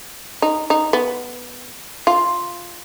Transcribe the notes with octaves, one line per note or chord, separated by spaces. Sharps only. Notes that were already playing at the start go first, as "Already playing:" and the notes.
D#4
D#4
B3
F4